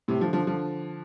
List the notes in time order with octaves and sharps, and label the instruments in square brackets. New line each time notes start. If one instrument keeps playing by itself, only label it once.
[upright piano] A2 C3
D3 F3
D3 F3
D3 F3